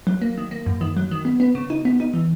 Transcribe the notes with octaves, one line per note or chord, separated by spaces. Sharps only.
F#3
A#3
D#3
A#3
F#2
D#3
F#3
D#3
B3
B3
C#3
D#4
B3
D#4
E3